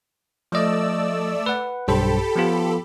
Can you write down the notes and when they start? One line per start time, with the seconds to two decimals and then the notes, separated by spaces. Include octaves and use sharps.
0.52 F3 A3 D5 D#5 E6
1.46 B4 F#5
1.88 B1 G2 G4 A4 C5 B5
2.36 F3 B3 F4